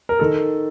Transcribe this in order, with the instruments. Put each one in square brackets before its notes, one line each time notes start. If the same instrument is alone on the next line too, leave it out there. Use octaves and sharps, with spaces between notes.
[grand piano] A#4
D#3 A4